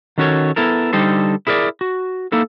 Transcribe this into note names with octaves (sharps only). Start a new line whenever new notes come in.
D#3 C#4 F#4 A4 C#5
B3 E4 A4 A#4
D3 G3 D#4 A4 C5
E4 G#4 A#4 B4 D5
F#4
A#3 D#4 E4 A4